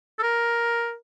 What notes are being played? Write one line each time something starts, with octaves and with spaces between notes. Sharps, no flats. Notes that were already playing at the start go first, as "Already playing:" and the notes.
A4
A#4